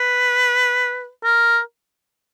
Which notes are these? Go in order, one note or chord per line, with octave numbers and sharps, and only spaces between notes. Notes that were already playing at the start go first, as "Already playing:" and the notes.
Already playing: B4
A#4